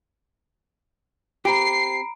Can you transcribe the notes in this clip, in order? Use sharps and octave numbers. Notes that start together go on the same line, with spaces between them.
C4 G4 A#5 B5 C7 D7